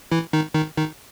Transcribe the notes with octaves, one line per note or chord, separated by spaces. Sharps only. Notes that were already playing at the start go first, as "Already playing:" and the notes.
E3 E4
D#3 D#4
D#3 D#4
D#3 D#4